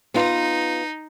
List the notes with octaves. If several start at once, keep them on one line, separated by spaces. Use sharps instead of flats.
B3 D#4 F4